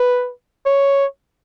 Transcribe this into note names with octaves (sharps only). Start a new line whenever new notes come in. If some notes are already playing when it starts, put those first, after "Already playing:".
Already playing: B4
C#5